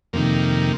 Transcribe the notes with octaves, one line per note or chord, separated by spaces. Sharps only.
F2 C3 D#3 A#3